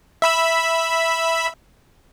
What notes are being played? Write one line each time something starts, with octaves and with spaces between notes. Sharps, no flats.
E5 B5 E6